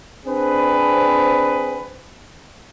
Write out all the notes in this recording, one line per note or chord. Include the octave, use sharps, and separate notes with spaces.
C4 D4 G#4 B4